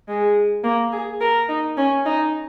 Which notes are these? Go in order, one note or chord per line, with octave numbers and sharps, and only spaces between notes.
G#3
A#3
G#4
A#4
D#4
C#4
D#4